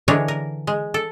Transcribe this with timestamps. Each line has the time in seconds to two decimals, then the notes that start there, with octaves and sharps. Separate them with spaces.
0.08 D3 E3 G#3 D4 A#4 C#5
0.28 A#4
0.67 G#3
0.94 A4